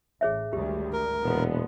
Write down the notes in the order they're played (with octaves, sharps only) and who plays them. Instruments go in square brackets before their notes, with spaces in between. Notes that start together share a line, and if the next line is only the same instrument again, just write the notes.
[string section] A1 [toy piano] G#4 C#5 E5
[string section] G#1 D2 G3 [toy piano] G4
[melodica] A#4
[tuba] E1 [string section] A#2 D3 B3